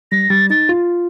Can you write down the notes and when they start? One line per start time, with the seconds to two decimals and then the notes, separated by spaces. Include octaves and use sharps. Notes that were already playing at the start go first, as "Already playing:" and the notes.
0.12 G3 A#6
0.30 G3 A6
0.50 D#4 A6
0.69 F4